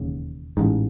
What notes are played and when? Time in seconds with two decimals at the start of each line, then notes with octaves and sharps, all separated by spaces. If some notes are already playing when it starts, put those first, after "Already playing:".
Already playing: E1 D#2 C#3
0.57 A1 G#2